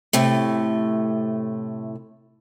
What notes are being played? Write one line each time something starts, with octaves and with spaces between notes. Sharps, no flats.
A2 C3 A3